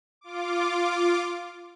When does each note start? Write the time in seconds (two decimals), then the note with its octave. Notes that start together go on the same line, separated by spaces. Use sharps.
0.21 F4 D6